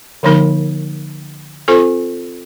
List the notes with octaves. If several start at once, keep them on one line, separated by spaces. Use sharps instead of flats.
D3 F3 A#3 D#4 A#4
C4 F4 A4 C5